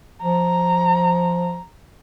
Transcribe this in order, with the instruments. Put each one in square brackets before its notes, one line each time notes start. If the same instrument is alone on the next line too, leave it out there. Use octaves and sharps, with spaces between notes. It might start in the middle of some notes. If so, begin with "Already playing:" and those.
[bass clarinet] F3 [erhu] A#5